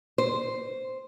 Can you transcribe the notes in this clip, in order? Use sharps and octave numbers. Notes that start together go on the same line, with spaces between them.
C5